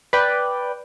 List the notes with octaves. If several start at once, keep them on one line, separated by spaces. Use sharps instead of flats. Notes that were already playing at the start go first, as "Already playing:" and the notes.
B4 D5 G5